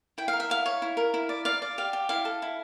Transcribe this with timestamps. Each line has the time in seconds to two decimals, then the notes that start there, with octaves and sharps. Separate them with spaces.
0.18 E4 G5
0.28 F5
0.33 A#4
0.40 E5
0.50 E4 F5
0.66 C#5
0.82 E4
0.97 A#4
1.14 E4
1.29 D5
1.45 D5 F5
1.62 D5
1.78 G4 F5
1.93 G4
2.09 E4 F5
2.25 A4
2.42 E4